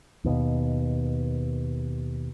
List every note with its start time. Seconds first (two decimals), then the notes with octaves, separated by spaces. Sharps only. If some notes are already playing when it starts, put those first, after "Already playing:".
0.24 D#2 B2